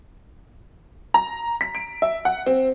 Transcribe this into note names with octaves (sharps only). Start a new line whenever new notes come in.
A#5
B6
D7
E5
F#5
C4